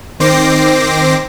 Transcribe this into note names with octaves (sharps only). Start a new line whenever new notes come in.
D#3 C4 C5 D6 A#6 C7